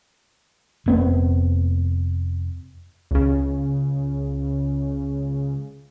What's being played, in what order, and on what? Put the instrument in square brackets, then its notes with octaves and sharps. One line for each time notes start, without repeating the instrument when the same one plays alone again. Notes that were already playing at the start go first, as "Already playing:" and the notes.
[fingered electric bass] F1 B3 C4
[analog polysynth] C#2 C#3